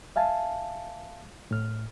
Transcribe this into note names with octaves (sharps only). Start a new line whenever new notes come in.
E5 F5 G#5 A5
A2 F6